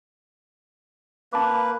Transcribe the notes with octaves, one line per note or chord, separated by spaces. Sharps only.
A#3 B4 A5 D6